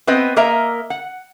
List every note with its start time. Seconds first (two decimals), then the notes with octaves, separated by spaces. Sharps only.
0.07 B3 C4 B4 D#5
0.36 A#3 A#4 D#5 E5 A#5
0.90 F#5